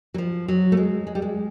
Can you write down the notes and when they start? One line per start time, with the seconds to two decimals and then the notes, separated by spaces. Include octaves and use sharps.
0.14 F#3
0.18 F3
0.48 F#3
0.72 A3
0.77 G#3
1.07 G#3
1.15 G3
1.22 G#3